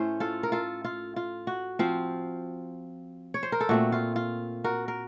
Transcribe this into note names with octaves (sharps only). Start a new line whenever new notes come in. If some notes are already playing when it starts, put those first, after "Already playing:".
Already playing: A2 A3 C#4 C5
F4 A4
A#4
F4 A4
F4
F4
F#4
F3 C4 F4
C#5
C5
A#4
A4
A#2 A3 C4 F#4
F4
F4
F#4 A#4
A#4